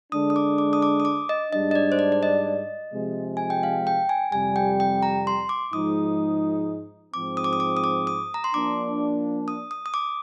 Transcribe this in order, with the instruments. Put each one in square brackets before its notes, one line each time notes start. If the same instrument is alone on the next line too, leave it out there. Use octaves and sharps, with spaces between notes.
[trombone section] D3 G#3 D4 [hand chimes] D#6
[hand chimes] D#6
D6
D6
D#6
D6
D#6
D6
D#5
[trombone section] G#2 G3 D4 [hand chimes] D#5
[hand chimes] D#5
D5
C5
D5
D5
D#5
[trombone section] C3 F3 G#3
[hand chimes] G#5
G5
F5
G5
G#5
[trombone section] F2 C3 G3 [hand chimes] G#5
[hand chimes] G5
G5
A#5
C6
D6
[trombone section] G#2 F3 G#3 D#4 [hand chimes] D#6
[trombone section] G#2 F3 C4 [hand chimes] D6
[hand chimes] D#6
D6
D#6
D6
D#6
D6
D#6
A#5
C6
[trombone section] F3 A#3 D4 [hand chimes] D6
[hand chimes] D#6
D#6
D#6
D6